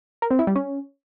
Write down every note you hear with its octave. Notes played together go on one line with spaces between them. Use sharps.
A#4
C4
E4
G3
C#4